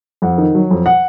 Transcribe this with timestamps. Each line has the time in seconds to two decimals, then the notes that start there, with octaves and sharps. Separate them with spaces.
0.22 F2 F#5
0.38 D#3
0.55 F#3
0.71 F2
0.86 F#5